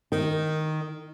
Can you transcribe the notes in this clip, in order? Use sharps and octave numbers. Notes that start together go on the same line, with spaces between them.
D#3